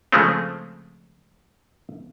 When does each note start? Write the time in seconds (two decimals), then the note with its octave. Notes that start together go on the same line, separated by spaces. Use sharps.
0.12 C#3 F3 G#3 A3 C4